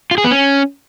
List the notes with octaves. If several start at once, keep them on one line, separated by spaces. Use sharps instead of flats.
F4
G#4
B3
C#4